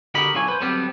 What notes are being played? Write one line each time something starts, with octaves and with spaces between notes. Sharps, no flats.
D3 F#4 G4 A#4 D#5 B5
B1 D3 F4 C#5 G#5
B4 C5
D3 F#3 G3 B3 C4